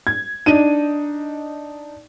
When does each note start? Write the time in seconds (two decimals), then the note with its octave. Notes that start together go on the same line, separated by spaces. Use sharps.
0.07 G#6
0.46 D4 D#4 D#7